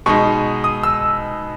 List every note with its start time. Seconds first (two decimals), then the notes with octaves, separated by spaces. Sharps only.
0.06 B2 G#3 D#4 C#6
0.64 D#6
0.83 E6